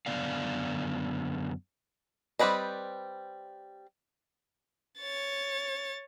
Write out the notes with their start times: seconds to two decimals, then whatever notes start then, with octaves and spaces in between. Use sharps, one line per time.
0.06 F#2 D3 E3 B3 D5 F5
2.39 G3 C4 B4 D5 D#5
4.98 C#5 A6